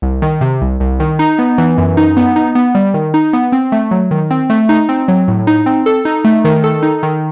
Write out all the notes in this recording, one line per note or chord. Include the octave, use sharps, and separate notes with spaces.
C2
D#3
C3
C2
C2
D#3
D#4
B3
E3
F#2
D#4
B3
D#4
B3
G3
D#3
D#4
B3
C4
A3
F#3
D#3
C4
A3
D#4
C4
F#3
A2
D#4
C4
A4
D#4
A3
D#3
A4
D#4
D#3